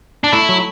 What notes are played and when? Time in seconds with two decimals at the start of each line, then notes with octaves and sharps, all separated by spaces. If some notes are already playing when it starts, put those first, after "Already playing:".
0.24 D4
0.32 A3 E4
0.49 F#3